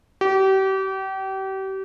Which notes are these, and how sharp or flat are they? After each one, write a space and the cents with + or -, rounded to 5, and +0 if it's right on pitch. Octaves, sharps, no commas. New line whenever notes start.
G4 -35